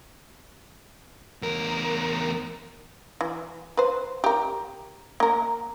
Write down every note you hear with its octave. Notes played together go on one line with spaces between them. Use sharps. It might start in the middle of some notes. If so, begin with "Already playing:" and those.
E2 A#4
E3
B4 C5
G4 A#4
A#3 A#4